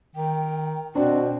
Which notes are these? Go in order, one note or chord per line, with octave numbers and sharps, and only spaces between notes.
D#3 G5
B2 C4 D4 F#4